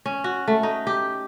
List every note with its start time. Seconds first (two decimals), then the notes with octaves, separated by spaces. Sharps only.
0.06 C#4
0.24 F#4
0.48 A3
0.63 D#4
0.87 G4